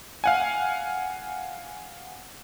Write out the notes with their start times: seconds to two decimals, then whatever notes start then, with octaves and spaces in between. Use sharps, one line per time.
0.24 F5 F#5 G#5